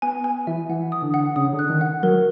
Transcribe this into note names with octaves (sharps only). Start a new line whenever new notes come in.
B3 G#5
G#5
E3 E5
E3 F#5
D#6
D3
F#5
C#3 D#6
D3
F#6
D#3
F#5
F#3 A#4